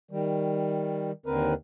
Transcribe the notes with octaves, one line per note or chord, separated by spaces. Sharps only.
D#3 G3
D#2 D3 C4 A#4 B4